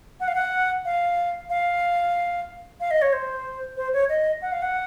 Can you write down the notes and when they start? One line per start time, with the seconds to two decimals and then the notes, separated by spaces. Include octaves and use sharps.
0.20 F#5
0.28 F5
0.35 F#5
0.85 F5
1.50 F5
2.80 F5
2.91 D#5
3.02 C#5
3.13 C5
3.77 C5
3.93 C#5
4.09 D#5
4.42 F#5
4.52 F5
4.62 F#5